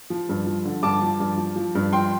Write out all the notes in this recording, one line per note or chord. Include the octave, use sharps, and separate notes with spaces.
F3
G2
F3
D3
G2 A5 D6
F3
G2
F3
F3
G2
F3 G5 C6